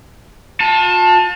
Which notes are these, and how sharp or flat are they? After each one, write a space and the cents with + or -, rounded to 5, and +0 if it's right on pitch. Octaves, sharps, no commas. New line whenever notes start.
F4 +45 A5 +0